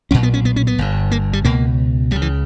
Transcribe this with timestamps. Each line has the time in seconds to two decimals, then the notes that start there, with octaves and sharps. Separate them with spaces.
0.11 B1 A#2 C#4
0.23 B3
0.34 C#4
0.45 B3
0.56 C#4
0.67 B3
0.78 G1 G2
1.11 A#3
1.33 G3
1.45 C#2 B2 A#3
2.11 C#2 G3
2.16 C#3
2.22 E3